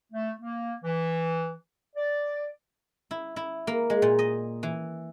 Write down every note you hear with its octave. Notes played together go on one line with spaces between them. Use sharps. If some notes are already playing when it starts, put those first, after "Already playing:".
A3
A#3
E3
D5
E4
E4
A#3
G#3
A#2
D#5
E3